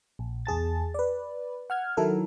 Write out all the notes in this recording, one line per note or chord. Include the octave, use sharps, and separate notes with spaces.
A#1
E2 G#4 A5 A6
B4 D5
F#5 F6 G#6
D#3 F#3 E4 A4 A#4